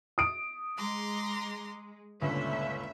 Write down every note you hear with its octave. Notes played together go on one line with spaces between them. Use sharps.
D#6 D7
G#3 A#5 C6 D6
G1 C#2 A#2 D3 C#4 E5